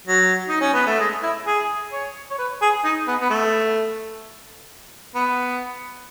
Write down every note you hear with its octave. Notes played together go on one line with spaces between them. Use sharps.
F#3
D#4
C#4
B3
A3
G#3
E4
G#4
C#5
C#5
B4
G#4
D#4
B3
B3
A3
B3